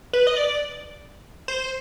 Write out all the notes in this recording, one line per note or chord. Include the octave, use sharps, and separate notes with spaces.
B4
D#5
D5
C5